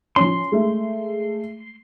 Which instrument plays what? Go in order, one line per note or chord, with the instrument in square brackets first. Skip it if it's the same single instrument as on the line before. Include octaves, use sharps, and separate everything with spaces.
[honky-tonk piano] F3 C#4 [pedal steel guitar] C6
[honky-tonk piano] G#3 A3